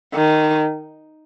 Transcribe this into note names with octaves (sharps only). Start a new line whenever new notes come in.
D#3